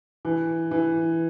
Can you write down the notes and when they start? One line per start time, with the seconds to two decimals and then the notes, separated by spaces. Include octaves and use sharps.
0.25 E3
0.71 E3